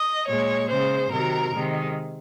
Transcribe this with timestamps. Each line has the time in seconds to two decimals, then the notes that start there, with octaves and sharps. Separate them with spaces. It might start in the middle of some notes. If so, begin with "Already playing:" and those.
Already playing: D#5
0.27 A#2 G#3 C#5
0.69 C#3 G#3 C5
1.12 C3 D#3 F#3 A#4
1.53 C3 D#3 G#3